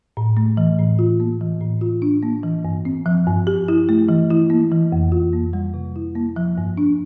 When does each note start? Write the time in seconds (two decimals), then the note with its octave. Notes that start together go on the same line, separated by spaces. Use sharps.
0.17 A2
0.37 A3
0.57 E3
0.79 A2
0.99 F4
1.20 A#3
1.41 E3
1.61 A2
1.81 F4
2.02 D4
2.23 A#3
2.43 E3
2.65 G2
2.85 C4
3.06 F3
3.27 G2
3.47 G4
3.68 E4
3.89 A3
4.09 E3
4.30 E4
4.50 A#3
4.72 E3
4.92 F2
5.12 F4
5.33 A#3
5.53 G3
5.74 C3
5.96 E4
6.15 A#3
6.36 F3
6.58 G2
6.77 D4